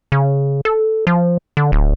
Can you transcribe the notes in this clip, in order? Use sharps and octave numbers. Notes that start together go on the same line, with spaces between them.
C#3
A4
F3
D3
D1